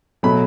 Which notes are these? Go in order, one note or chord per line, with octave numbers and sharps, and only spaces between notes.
B2 F#3 A3 B5